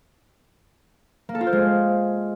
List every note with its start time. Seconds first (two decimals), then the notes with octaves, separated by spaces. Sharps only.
1.29 A#3
1.35 A4
1.41 F4
1.47 C5
1.53 G#3